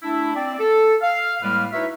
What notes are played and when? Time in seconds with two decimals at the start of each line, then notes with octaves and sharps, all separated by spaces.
0.03 A3 D4 E4
0.35 C4 D5
0.59 A4
1.02 F5
1.42 A2 G3 G#3 A#3 B4 F6
1.72 D#4 E4 F#4 B4 C#5 E5